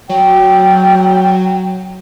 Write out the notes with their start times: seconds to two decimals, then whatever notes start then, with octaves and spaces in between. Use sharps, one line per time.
0.09 F#3 G5